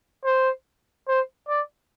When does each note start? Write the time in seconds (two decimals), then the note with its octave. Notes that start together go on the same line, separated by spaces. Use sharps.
0.25 C5
1.08 C5
1.48 D5